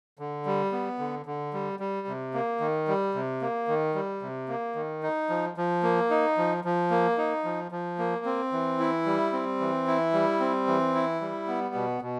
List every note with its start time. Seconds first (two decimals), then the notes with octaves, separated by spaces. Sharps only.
0.19 D3
0.46 G3
0.72 B3
0.99 D3
1.26 D3
1.53 G3
1.80 G3
2.07 C3
2.34 A#3
2.60 D#3
2.88 G3
3.14 C3
3.41 A#3
3.68 D#3
3.95 G3
4.22 C3
4.48 A#3
4.75 D#3
5.03 D#4
5.29 F3
5.57 F3
5.83 A#3
6.10 D#4
6.38 F3
6.64 F3
6.90 A#3
7.17 D#4
7.44 F3
7.72 F3
7.99 A#3
8.25 C4
8.52 E3
8.79 E4
9.06 G3
9.32 C4
9.60 E3
9.87 E4
10.13 G3
10.40 C4
10.67 E3
10.94 E4
11.21 G3
11.47 B3
11.75 B2
12.02 B2